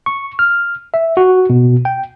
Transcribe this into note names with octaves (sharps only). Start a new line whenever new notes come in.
C#6
F6
E5
F#4
B2
G5